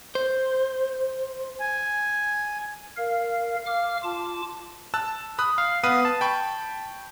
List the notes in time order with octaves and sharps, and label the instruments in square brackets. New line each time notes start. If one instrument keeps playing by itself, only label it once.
[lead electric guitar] C5
[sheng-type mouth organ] G#5
[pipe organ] A#4 F5
F5 D6 F6
F4 A5 D6
[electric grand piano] A5 E6 F#6
B5 D#6 F#6
[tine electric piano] F5
[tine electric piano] B3 F5 [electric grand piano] B4 D#6 D#7
[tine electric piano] A5
[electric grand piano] G5 B5 C#6